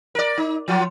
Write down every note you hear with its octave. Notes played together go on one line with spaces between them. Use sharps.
A#4 D5
D#4
F3 F#3 F4